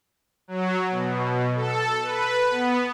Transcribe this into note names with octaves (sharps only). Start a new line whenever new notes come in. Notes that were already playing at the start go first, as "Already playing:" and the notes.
F#3
B2
A4
B4
B3